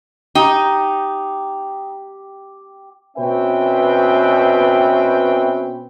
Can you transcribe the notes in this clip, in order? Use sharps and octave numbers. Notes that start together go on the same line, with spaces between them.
D#4 G4
B2 C4 C#4 B4 E5 G5